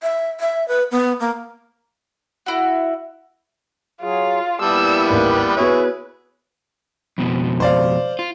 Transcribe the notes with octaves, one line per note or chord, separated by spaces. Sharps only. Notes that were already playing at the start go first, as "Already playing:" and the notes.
E5
E5
B4
B3
A#3
E4 F#4
F#3 F4 G#4
A#2 G3 B3 E4 A5 E6
A1 D#2 B4
B3 E4 F#4 G#4 C#5
F2 B2
C5 D5 F5
F4